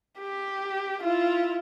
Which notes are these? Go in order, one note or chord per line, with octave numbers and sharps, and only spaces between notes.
G4
E4 F4